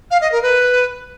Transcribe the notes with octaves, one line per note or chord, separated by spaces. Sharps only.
F5
D#5
A#4
B4